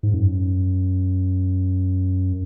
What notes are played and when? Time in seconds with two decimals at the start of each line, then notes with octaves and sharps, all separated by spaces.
0.03 G#2
0.14 F#2